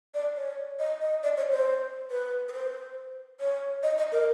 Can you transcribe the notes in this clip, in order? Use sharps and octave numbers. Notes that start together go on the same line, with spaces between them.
D5
C#5
D#5
D#5
D5
C#5
C5
B4
B4
C5
C#5
D#5
D#5
A#4